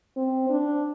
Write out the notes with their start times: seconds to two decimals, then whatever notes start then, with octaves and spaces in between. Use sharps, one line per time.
0.17 C4
0.50 D4